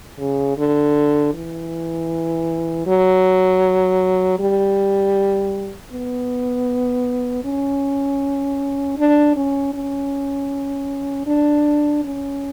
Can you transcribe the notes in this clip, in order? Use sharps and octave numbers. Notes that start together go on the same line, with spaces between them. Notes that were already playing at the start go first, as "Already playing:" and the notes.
C#3
D3
E3
F#3
G3
B3
C#4
D4
C#4
C#4
D4
C#4